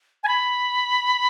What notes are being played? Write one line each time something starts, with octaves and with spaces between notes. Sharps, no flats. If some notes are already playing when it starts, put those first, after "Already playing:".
G#5
B5